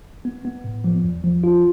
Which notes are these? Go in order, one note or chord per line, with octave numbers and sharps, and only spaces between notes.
B3
B3
A2
F3
E2
F3
F4